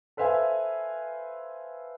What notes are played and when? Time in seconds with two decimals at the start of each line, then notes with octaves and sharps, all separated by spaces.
0.17 A4 B4 C5 E5 F5 G#5